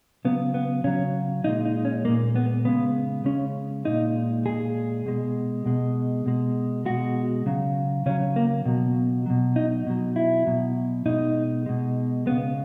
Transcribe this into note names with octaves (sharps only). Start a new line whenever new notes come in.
C#3 F#3 B3
B3
C#3 F#3 C#4
A#2 G#3 D#4
D#4
C#4
A#2 G#3 A#3
B3
C#3 G#3 B3
C#3 G#3 C#4
A#2 G#3 D#4
A#2 G#3 G#4
B2 G#3
B2 G#3
B2 G#3
B2 G#3 F#4
C#3 F#3
C#3 F#3 C#4
A#3
B2 F#3
B2 F#3
D#4
B2 F#3
E4
B2 F#3
B2 G#3 D#4
B2 G#3
C#3 G#3 B3